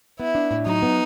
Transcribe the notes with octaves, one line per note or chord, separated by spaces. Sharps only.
B3 E4
D4
A2
F#3 D#4
B3